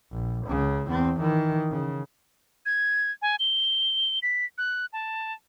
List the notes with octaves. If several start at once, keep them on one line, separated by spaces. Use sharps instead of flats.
A#1
C#2 C#3
E2 C4
D#3 E3
C#3
G#6
G#5
G7
B6
F#6
A5